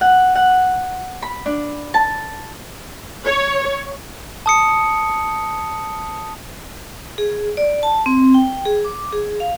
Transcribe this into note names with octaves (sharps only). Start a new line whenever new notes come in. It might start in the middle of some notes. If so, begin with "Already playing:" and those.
F#5
F#5
B5
D4
A5
C#5
A5 D#6 C#7
G#4
D5
A5
C4
G5
G#4
D6
G#4
F5